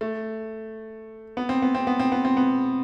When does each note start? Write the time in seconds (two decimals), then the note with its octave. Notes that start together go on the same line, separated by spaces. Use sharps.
0.01 A3
1.37 B3
1.49 C4
1.62 B3
1.75 C4
1.87 B3
1.99 C4
2.12 B3
2.25 C4
2.37 B3